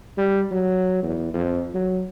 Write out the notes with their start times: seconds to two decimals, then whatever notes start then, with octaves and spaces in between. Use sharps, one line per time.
0.18 G3
0.51 F#3
1.03 E2
1.34 F2
1.74 F#3